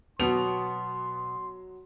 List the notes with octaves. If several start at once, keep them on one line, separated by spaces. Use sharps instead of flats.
B2 F#3 B3 C6 F7